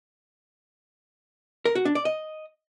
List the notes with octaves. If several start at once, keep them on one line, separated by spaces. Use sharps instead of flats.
A#4
F#4
D4
D5
D#5